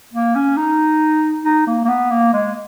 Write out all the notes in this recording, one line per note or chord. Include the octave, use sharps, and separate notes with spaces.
A#3
C#4
D#4
D#4
A#3
A#3
B3
A#3
G#3